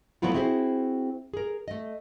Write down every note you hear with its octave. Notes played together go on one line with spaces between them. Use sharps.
F3 F#3 A3 B3 E4 F4
C4 E4 F#4 G#4 C5
G#4 A#4
A3 D#5